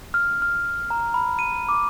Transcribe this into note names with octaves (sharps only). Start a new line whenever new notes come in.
F6
F6
A#5
B5
D#7
D6